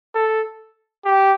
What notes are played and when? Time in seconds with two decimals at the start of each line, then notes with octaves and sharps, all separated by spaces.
0.15 A4
1.05 G4